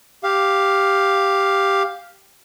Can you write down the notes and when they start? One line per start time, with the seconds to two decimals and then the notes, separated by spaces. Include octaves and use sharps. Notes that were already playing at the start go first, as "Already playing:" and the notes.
0.23 G4 F5